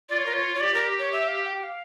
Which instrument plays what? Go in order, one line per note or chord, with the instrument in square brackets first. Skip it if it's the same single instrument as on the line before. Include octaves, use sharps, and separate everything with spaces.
[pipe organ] F4 [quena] D5
[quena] C#5
A#4
C#5
C#5
[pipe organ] G4 [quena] D5
[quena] A#4
C#5
E5
F5
G5
F5